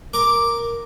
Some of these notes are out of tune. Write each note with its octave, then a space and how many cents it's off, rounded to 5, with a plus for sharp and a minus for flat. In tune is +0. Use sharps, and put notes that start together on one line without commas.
A#4 +0 D6 +0